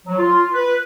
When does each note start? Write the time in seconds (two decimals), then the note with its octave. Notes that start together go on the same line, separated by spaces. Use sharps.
0.07 F#3
0.18 F4
0.53 B4